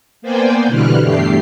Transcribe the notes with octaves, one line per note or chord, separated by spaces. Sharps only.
A#3 B3 C5 D5 G5 G#5
B2 D3 E3 G3 F6 F#6
E2 G2 A3 G4 C7